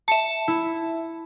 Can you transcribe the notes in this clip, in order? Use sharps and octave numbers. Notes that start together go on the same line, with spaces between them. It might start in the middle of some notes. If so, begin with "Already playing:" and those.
E5 A5 C#7
E4